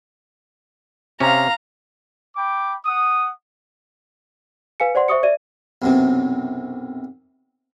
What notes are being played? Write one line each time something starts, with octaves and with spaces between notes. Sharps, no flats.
C3 C#4 F5 A#5
G5 B5 D6
F#5 D#6
B4 F5 G#5 C#7
C5 D5 F#5 C6
C5 E5 C#6 D#6 C#7
D5 E5 D#7
B1 F#2 C3